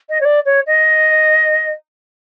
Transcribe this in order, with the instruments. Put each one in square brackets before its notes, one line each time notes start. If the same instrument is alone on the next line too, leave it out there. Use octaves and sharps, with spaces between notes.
[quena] D#5
C#5
D5
C#5
D#5